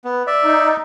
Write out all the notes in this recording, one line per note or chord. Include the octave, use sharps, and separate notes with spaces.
B3
D5 E5
D#4